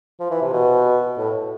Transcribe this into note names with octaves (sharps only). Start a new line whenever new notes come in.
F3
E3
C3
B2
A2